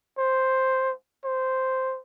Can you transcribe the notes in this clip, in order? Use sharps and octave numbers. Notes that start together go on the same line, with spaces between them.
C5
C5